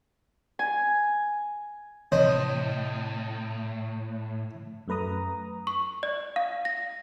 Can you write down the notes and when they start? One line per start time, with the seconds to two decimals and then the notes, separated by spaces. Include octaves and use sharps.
0.59 G#5
2.12 A2 C3 C5 C#5 D#5
4.88 F#2 A3 B4 A#5 D#6
5.67 C#6
6.03 D5
6.36 F5
6.65 A#6